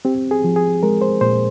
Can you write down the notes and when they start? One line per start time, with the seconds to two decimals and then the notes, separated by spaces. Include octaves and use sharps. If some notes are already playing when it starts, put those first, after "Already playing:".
0.05 C4 G4
0.31 G#4
0.44 F3
0.56 G#4
0.83 G#3 A#4
1.01 C5
1.21 A#2 C5